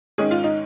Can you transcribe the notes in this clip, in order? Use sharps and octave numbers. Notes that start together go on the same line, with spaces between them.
G#2 D#3 G#3 C#4 G#4
F4
D#4